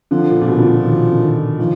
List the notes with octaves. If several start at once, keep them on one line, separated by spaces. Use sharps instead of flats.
D3 F3
A#2
A#2
B2
D3
B2
D#3
D3
D#3
D#3 F3